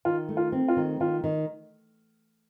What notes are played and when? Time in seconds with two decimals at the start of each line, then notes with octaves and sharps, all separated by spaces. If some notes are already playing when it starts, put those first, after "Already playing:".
0.05 D#3 F4
0.29 A3
0.37 F4
0.52 C4
0.68 F4
0.77 D#3
1.00 D#3 F4
1.24 D#3